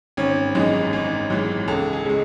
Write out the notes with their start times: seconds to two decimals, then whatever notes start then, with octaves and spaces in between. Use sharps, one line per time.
0.17 G#1 C#4
0.55 F#2 E3 G#3 D#4
0.93 G#1
1.30 F#2 E3 G#3
1.68 C#2 A4
1.93 G#4
2.05 C#3 G#3